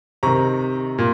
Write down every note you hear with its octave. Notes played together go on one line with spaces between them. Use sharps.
C3 D#3 A#5 C#6
A#2